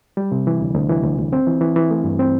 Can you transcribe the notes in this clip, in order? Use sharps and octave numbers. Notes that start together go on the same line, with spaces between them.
G3
C3
E3
D2
D2
E3
D2
D2
C4
E3
E3
E3
A3
G2
C4